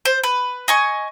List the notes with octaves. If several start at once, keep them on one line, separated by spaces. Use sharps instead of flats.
C5
B4
D#5 G#5 C#6